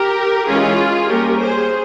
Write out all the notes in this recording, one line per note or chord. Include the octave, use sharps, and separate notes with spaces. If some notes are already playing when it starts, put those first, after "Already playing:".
Already playing: G4 A#4
E3 G#3 C#4 F4 G#4
G3 A#3 C#4 G4 A#4
G#4 C5